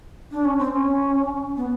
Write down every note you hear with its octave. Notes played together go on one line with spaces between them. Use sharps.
D4
C#4
C4
C#4
B3